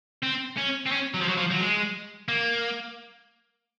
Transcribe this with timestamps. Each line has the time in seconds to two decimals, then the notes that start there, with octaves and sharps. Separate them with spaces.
0.23 C4
0.57 C#4
0.86 C4
0.91 C#4
1.14 F#3
1.21 F3
1.28 F#3
1.37 F3
1.51 F#3
1.60 G#3
2.29 A#3